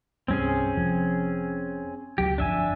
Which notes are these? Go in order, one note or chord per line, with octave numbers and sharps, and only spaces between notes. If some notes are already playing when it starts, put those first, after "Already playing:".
C2 G2 G3 C4 C#4 G#4
F1 F3
C#2 F#3 G4
G1 F2 D4 E5 G#5